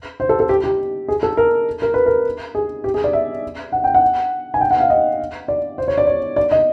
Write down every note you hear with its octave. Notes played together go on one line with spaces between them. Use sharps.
C5
A4
A4
G4
G4
G#4
A4
A#4
A#4
B4
A#4
G#4
G4
G#4
D5
E5
F#5
G5
F#5
G#5
G5
F#5
F5
D#5
D5
C5
C#5
D5
C#5
D5
D#5